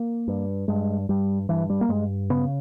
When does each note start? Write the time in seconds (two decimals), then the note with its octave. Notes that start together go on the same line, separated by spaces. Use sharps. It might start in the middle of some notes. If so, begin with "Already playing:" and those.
Already playing: A#3
0.28 G2
0.68 G2 G#3
1.09 G2 G3
1.49 G2 E3
1.70 G3
1.81 A#3
1.89 G2 G#3
2.30 C#3 B3